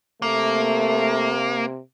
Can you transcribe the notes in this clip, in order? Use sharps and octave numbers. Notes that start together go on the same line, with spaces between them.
C3 A3 A#3